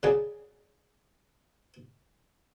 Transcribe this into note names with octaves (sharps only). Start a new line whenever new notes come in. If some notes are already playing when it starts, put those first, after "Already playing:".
C#3 F#3 G#4 D5